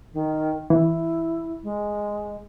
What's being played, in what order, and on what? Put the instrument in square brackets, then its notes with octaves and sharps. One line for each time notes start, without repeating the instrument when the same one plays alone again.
[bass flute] D#3
[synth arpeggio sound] E3 [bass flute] E4
[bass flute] G#3